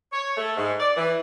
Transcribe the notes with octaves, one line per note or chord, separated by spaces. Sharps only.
C#5
A3
G#2
D5
E3